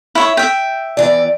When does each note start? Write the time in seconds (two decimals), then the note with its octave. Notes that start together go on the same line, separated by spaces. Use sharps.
0.15 E4 C#5 E5
0.37 E5 G5
0.97 E2 E3 D5